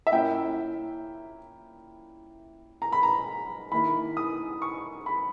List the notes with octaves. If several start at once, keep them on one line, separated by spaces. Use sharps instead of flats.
E5
A#2 A#3 C#4 E4 G5
A#5
B5
A#5
D#3 A#3 E4 B5
D#6
C#6
B5